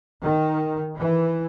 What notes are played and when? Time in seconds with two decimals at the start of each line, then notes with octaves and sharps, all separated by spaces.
0.23 D#3
0.96 E3